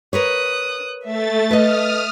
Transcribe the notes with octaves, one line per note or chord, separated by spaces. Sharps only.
A#4 B4 C#5 D#6 F#6
A3 E5 A6
B4 D#5 D#6 F6